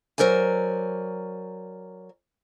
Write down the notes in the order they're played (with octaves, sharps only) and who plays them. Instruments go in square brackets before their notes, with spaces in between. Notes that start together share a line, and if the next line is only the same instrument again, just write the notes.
[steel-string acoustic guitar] F#3 A#4 C5 D5 G#5